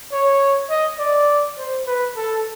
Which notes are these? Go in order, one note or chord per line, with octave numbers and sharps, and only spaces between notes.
C#5
D#5
D5
C5
B4
A4